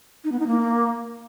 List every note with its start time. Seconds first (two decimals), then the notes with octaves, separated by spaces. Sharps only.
0.24 D#4
0.32 B3
0.40 D#4
0.47 A#3